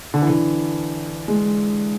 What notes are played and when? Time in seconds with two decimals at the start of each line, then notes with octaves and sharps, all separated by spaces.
0.14 D3
0.22 E3
0.30 D3
1.28 G#3